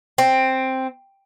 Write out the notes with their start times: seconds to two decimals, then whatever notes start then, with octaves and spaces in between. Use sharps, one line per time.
0.18 C4